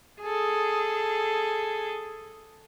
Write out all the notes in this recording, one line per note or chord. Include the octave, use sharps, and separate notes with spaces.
G#4 A4